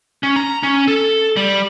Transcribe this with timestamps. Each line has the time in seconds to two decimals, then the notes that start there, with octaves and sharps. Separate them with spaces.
0.23 C#4
0.36 A#5
0.63 C#4
0.88 A4
1.36 G3